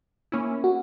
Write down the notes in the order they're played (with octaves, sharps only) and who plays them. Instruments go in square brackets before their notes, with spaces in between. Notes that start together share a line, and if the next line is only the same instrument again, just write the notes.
[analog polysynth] A#3 C#4 E4
[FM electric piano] F#4